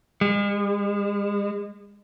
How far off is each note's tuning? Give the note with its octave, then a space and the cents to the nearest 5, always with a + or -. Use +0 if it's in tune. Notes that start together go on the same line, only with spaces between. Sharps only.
G#3 -40